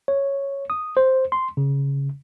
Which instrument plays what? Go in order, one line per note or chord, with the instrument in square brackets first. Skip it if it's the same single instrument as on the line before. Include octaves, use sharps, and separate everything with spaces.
[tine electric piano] C#5
D#6
C5
C6
C#3